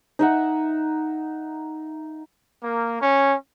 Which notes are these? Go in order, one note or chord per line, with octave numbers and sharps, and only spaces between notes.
D#4 E5 F#5
A#3
C#4